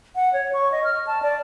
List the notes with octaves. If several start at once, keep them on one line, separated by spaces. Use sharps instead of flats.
F#5
C#5
C#6
D#5
F6
A5
D5